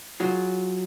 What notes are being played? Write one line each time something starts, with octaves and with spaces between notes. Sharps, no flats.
F#3 F4 G#4